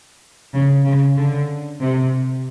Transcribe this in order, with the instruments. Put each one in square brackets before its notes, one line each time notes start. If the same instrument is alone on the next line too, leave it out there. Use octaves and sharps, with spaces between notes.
[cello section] C#3
C#3
D3
C3